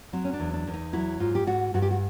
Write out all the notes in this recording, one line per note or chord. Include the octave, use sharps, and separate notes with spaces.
F#3 C4
C#4
D4
E2
D4
E2
D#4
F#3 E4
G#2 F4
G4
G#2 F#4
G2 F#4
G4
F#4